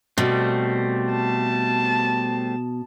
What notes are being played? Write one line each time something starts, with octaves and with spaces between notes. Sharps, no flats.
B2 G3 A3 C4
A5